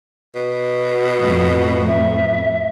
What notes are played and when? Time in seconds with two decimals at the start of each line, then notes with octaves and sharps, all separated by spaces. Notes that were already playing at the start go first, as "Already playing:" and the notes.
0.35 B2
1.18 F2 A2
1.87 E5